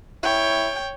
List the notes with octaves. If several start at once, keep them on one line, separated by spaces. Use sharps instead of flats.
E4 C#5 G5